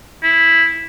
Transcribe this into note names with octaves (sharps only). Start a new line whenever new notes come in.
E4